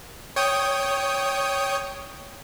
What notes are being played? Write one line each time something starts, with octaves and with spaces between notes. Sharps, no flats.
C#5 G5 D#6